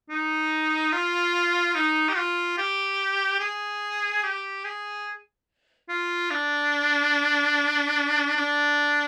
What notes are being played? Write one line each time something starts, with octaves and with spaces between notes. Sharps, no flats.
D#4
F4
D#4
G4
F4
G4
G#4
G4
G#4
F4
D4
D4